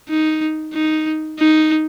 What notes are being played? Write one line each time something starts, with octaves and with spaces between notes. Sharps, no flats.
D#4
D#4
D#4